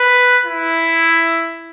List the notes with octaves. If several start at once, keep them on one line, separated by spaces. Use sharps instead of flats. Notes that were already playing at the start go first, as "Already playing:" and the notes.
Already playing: B4
E4